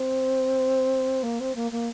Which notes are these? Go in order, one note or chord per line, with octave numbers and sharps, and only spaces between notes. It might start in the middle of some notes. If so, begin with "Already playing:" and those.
Already playing: C4
A#3
C4
A#3
A#3